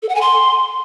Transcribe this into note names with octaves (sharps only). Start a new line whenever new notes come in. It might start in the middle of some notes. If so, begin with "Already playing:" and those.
A4
F#5
G#5
C6